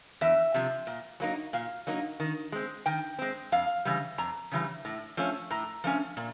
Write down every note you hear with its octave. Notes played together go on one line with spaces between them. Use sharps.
E2 E5
C3 F3
A#2
F#3 A#3 D#4
A#2 F5
F#3 A#3 D#4
D#3
G#3 C4
D#3 G5
G#3 C4
F2 F5
C#3 E3 G3
F2 A#5
C#3 E3 G3
A2
F3 A3 C#4
A2 A#5
F3 A3 C#4
A#2